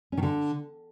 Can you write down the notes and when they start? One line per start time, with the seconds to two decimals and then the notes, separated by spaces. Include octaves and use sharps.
0.12 C#4
0.17 D#3
0.23 D3